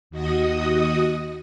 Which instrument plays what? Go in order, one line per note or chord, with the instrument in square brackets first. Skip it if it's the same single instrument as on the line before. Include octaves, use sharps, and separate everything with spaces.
[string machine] D#2 F#4 D#5 D#6